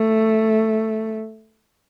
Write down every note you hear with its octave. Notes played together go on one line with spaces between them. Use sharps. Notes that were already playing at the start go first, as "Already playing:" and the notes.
Already playing: A3